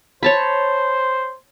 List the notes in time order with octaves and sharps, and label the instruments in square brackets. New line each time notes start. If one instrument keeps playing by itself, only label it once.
[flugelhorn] C5 [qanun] C#5 A5 B5